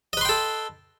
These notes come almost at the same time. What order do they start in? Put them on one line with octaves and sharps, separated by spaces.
D#5 B4 C6 G5 A4